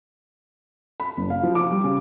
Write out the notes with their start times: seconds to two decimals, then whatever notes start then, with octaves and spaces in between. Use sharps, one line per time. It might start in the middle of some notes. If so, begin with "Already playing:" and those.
1.00 B5
1.17 F#1
1.30 F5
1.43 F3
1.55 D6
1.71 G3
1.84 C#3